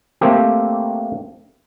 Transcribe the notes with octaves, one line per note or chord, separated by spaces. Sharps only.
A3 A#3 C4 G4